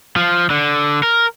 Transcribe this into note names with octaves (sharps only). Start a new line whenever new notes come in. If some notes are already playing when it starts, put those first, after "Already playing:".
F3
D3
A#4